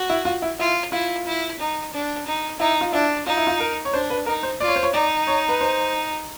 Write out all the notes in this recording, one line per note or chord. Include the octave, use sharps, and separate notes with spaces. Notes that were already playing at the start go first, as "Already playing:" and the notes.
Already playing: F#4
E4
F4
E4
E4 F4
E4 F4
E4
D#4
D4
D#4
D#4 E4
F4
D4 E4
D#4 F4
E4
F4
A#4
C#5
D4 C5
B4
D#4 A#4
C5
F4 D5
C#5
C5
C#5
D#4 D5
C#5
B4
C5